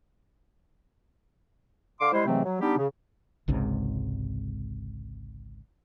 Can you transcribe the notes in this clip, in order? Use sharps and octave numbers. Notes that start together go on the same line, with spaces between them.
D3 F5 C6 D6
G3 G#3 E4 C5
G#2 C3 E3 F#3 A3 C4
F#3
G3 B3 D4 D#4 G4
C#3
G#1 C#2 G#2 C3